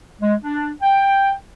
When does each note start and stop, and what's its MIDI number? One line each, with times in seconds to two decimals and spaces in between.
0.21 0.35 56
0.44 0.69 62
0.82 1.32 79